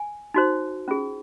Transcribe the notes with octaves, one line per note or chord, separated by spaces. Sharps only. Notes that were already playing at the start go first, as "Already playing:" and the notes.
Already playing: G#5
D#4 F#4 C5
C#4 F4 G#4